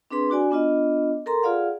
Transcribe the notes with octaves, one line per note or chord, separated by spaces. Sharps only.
C4 D4 G#4 B4 C6
D4 F#4 D5 G#5
B3 D4 F4 D#5
A4 A#4 A#5 C6
F4 G#4 D5 F5 F#5